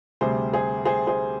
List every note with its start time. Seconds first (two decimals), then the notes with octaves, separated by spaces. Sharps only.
0.21 D2 C3 G3 G#4 C5
0.53 G#4 C5
0.85 G#4 C5
1.07 G#4 C5